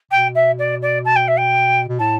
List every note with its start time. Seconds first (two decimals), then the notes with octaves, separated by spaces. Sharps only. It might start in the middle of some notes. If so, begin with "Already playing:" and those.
0.11 B2 G5
0.35 E5
0.59 D5
0.82 D5
1.05 A5
1.16 G5
1.28 E5
1.38 G5
1.88 B2
1.99 A2 A5